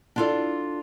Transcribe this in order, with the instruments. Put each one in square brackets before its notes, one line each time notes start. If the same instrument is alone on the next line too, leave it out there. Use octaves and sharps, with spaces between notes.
[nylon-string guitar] D4 E4 F4 G4 A4 D5